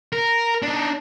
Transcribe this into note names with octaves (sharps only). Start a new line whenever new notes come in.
A#4
D4 D#4